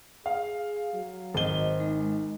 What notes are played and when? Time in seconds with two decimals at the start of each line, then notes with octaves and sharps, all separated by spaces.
0.26 G#4 F5
0.94 F#3
1.34 G#1 C5 D#5 G7
1.80 G#3 D#4